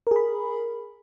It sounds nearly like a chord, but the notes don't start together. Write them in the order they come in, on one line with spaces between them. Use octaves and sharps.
A#4 G#4 B5